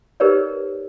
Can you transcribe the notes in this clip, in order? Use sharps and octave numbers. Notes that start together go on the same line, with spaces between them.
D#4 G4 A#4 B4 C#5 D5